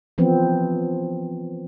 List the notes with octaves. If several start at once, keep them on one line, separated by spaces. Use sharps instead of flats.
E3 F3 B3 C4